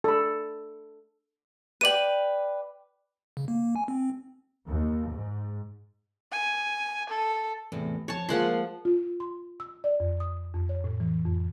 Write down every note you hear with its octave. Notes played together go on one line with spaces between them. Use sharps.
A4 B5
B4 D5 G5 D#7 F#7
C#3
A#3
G#5
C4
D#2
G#2
G#5
A4
E2 A2 C3
F2 C#5 A5
F3 G#3 A#3 F4 F#5 C6
F4
C6
E6
D5
F2
D#6
F2
C#5
A2
E3
F2